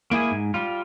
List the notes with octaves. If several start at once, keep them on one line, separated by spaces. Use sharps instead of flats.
A#3 E4 G#4 G#5
G#2
G3 F4